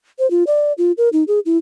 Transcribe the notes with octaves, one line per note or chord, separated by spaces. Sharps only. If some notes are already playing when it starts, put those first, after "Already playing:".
C5
F4
D5
F4
A#4
D#4
G#4
E4